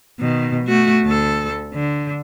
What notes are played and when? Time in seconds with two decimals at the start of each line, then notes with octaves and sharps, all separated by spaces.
0.20 B2 D#3
0.66 A3 F#4
1.05 D2 A4
1.73 D3